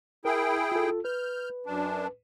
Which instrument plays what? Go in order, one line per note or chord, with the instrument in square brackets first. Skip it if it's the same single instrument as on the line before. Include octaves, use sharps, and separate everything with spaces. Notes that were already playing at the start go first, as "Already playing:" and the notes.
[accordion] E4 G#4 G5 [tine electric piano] A#4 B5
[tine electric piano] F4 A4
[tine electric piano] B4 [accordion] F6 G6
[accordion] F#2 D4